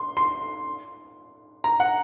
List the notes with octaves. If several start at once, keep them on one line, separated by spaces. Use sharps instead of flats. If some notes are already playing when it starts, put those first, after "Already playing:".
Already playing: C6
C6
A#5
F#5